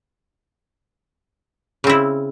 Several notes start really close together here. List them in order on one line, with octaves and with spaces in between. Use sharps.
C#3 C4 E4